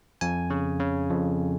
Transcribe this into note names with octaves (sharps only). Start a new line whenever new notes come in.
F2 G#5
C#3
C#3
F2